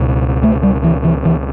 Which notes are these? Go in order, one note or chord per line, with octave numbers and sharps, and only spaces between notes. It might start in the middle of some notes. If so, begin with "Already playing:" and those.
Already playing: C#2 B2
A3
G3
E3
E3
E3